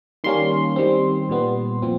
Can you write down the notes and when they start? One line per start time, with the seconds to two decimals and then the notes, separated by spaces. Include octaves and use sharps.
0.24 D#3 G3 A#3 C#4 C6
0.76 D#3 G3 C4
1.29 A#2 G3 B3
1.82 A#2 F3 C4